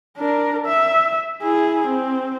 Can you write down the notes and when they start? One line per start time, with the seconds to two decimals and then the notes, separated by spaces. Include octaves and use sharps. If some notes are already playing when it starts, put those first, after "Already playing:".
0.17 D4 A#4
0.66 E5
1.43 E4 G#4
1.87 C4